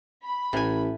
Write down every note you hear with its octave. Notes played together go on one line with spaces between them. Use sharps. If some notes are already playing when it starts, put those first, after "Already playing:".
B5
A1 A2 G#5